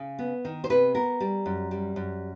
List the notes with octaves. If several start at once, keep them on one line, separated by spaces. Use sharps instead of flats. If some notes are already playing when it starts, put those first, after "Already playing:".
Already playing: C#3
B3
D#3
C5
C3 B4
B3 A#4
G3
F#2
G3
F#2